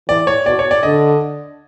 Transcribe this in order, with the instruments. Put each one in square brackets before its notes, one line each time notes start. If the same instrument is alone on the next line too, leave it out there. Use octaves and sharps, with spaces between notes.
[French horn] E3 [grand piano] D5
[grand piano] C#5
[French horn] B2 [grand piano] D5
[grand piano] C#5
D5
[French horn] D3 [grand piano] D#5